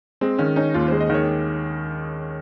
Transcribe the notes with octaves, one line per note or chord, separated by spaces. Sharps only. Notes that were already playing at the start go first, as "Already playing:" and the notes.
G#3 C4
D#3 C#4
C#4 D#4
D#2 F4
G#3 C5
D#5
D#3 C#5